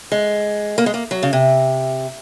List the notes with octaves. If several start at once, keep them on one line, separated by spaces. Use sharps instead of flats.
G#3
A#3
G#3
A#3
F#3
C#3
C3